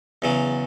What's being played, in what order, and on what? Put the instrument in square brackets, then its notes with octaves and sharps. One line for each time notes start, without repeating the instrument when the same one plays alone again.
[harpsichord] E2 C#3 F#3